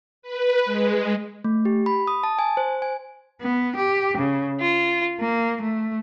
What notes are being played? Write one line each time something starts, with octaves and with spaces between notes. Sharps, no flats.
B4
G#3
A3
G4
B5
D#6
A5
G#5
C5
G#5
B3
G4
C#3
F4
A#3
A3